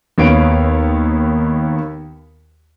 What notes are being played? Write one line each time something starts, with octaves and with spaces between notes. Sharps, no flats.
D#2 B3 C#5 F5 D7